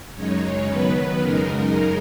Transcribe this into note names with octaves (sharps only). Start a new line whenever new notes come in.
F#2 C#3 G#3 D#4 C#5
D#3 F#3 B3 B4
F#2 C#3 G#3 D#4 A#4